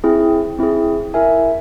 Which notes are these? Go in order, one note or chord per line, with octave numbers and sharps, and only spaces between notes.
C4 E4 G#4
C4 E4 G#4
E4 A#4 E5 G#5